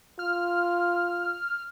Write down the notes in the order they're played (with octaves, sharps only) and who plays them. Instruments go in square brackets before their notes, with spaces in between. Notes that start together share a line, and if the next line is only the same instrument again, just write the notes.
[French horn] F4 [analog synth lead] F6